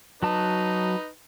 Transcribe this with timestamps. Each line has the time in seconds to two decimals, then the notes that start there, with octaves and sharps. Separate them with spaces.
0.23 F#3 D#4 B4 A5